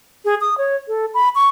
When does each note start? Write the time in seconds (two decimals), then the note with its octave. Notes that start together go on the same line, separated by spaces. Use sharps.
0.25 G#4
0.41 D#6
0.58 C#5
0.88 A4
1.14 B5
1.35 C#6